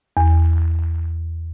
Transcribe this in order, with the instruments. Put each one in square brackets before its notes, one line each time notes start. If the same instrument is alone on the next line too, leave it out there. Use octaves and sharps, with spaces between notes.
[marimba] E2